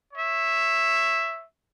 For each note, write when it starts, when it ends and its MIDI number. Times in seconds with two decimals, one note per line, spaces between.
0.14 1.42 73
0.14 1.42 76